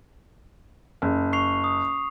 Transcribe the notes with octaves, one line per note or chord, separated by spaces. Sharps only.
F#1
C#6 C7 F7
D#6